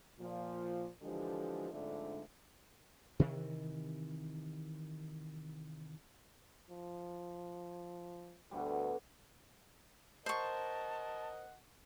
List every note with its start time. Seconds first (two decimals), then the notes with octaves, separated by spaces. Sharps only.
0.20 A#2 F3
1.02 D3 E3 F3 G#3 G4 A4
1.72 F2 G#2 D3 A3 D4
3.19 C3 D#3 E3
6.70 F3
8.51 D2 B2 D3 G3
10.26 A#4 C5 D#5 F#5 A5 C#6